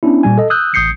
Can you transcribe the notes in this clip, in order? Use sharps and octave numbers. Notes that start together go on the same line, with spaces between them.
B3 C#4 D4 E4
A#2 G3 G#5
A4 D#5
D#6 E6 F#6 G6
A1 D#6 G6 C7 C#7